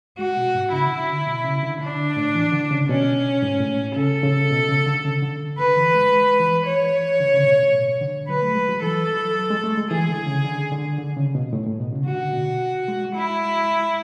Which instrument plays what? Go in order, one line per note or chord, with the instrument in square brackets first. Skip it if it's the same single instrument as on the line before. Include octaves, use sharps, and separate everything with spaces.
[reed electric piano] G#3 [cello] F#4
[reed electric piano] B2
G#2
[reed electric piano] C#3 [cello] E4
[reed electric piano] D3
D3
B2
C#3
D3
[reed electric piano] D3 [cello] D4
[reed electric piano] A2
E3
D3
C#3
[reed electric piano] B2 [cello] C#4
[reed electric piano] G#2
A2
[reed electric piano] C#3 [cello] A4
[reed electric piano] C#3
B2
C#3
D3
C#3
D3
[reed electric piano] D3 [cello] B4
[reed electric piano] E3
G#3
G#3
E3
[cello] C#5
[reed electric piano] D3
C#3
A2
B2
A2
B2
D3
[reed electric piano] F#3 [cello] B4
[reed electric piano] A3
G#3
F#3
[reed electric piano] E3 [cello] A4
[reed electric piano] F#3
G#3
A3
G#3
[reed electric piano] E3 [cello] G#4
[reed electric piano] D3
C#3
D3
D3
D3
C#3
B2
A2
A2
B2
C#3
[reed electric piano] D3 [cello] F#4
[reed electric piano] B2
G#3
[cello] E4